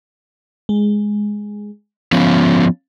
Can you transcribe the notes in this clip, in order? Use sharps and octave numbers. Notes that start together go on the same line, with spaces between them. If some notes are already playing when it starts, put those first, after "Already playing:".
G#3
F3 B3 C#4 F5